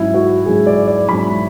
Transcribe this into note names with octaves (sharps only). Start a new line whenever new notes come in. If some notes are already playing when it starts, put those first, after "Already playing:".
Already playing: G#2 F#3 C#4 E4
F#4
G#2 F#3 C#4 G#4
D5
D5
G#2 F#3 C#4 B5